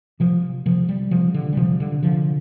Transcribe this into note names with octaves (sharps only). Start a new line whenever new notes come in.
C3 F3
C3 F3
G3
C3 F3
D3
G3
C3 F3
D3
D3 F3